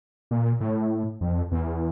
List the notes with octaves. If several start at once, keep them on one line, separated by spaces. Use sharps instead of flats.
A#2
A2
F2
E2